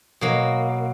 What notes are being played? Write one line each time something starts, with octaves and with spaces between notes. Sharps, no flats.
B2 F#3 A#3